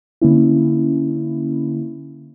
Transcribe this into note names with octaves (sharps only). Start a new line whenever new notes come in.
D3 A#3 C#4 E4